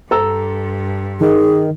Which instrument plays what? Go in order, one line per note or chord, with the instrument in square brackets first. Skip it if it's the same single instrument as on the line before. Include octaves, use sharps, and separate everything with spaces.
[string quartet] G2 [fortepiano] A4 A#5 E6
[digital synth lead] D#3 [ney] G#4